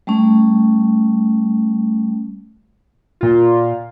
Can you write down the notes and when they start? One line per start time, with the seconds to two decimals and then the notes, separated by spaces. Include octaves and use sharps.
0.07 G3 A3 C#4
3.21 A#2 F4